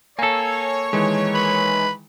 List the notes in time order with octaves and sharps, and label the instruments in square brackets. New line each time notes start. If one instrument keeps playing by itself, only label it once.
[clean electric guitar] A#3 A4 [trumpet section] C#5 [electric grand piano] G#5 E6
[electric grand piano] D#3 E3 G#3
[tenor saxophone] B4